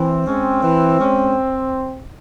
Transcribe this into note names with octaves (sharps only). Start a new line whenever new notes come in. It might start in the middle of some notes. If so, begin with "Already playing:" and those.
Already playing: E3 C4
G#3 C#4
E3
G#3 C#4